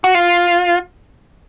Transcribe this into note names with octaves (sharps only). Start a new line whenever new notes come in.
F#4
F4